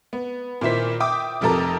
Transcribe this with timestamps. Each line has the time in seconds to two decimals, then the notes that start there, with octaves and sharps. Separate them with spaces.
0.13 B3
0.61 A#2 D#3 E4 C5 B6
1.00 E5 G5 D6 D#6
1.41 F1 F2 C3 A4 A#4 A#5